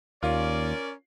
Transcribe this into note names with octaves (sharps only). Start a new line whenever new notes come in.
D#2 C#4 F4 A#4 D5